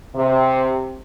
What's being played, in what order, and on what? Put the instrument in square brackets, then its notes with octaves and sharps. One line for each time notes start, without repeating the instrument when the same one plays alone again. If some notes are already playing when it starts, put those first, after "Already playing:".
[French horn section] C3